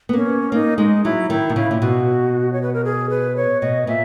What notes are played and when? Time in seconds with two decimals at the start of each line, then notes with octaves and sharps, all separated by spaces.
0.09 B3
0.13 A#3 C#4
0.52 A#3 D#4
0.78 G#3 D#4
1.04 F#3 E4
1.30 D#3 E4
1.50 B2
1.56 C#3 E4
1.71 A#2
1.81 B2 F#4
2.53 C#5
2.62 B4
2.74 A#4
2.85 G#4
3.10 B4
3.36 C#5
3.61 B2 D#5
3.87 A#2 E5